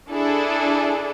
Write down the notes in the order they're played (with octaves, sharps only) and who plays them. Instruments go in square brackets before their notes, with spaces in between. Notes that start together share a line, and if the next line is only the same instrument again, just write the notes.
[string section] D4 E4 G#4 A4